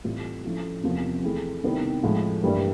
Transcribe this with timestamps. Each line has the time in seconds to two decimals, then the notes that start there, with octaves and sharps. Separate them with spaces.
0.04 A2 E3 G3 C4 F4
0.45 F3 A3 C#4 E4
0.84 E2 C3 F3 A#3 C#4
1.23 E3 A3 C4 E4 G#4
1.64 C3 D#3 G3 B3 E4
2.03 A2 F3 G#3
2.43 G2 E3 G3 A#3